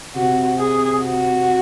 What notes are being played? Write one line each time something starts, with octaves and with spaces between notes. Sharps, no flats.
C3 F#4
G#4
F#4